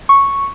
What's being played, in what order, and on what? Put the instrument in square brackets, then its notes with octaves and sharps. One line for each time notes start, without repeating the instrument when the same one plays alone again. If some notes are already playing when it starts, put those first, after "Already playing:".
[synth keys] C#6